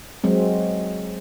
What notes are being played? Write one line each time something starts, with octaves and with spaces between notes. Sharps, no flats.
F#3 G#3 C4